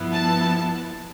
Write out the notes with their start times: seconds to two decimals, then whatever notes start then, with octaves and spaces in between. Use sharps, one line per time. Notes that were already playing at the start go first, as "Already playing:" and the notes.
Already playing: G2 F3 B3 E4
0.13 A5